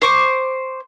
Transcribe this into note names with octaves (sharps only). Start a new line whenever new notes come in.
C5 C#6 D6